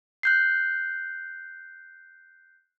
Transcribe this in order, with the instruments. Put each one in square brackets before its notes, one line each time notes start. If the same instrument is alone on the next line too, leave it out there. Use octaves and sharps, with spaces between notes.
[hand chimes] F#6 G6 C7